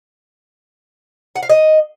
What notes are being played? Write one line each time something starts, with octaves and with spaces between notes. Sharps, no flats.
F#5
F5
D#5